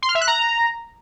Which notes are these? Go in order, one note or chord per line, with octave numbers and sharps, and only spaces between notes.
C6
F6
E5
F#6
A#5